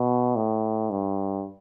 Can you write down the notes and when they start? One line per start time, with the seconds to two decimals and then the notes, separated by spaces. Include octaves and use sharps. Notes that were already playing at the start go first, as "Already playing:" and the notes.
Already playing: B2
0.36 A2
0.90 G2